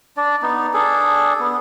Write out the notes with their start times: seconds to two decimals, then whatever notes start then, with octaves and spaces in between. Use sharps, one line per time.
0.17 D4 D5
0.42 B3 D#4
0.74 D4 G#4 A4
1.40 B3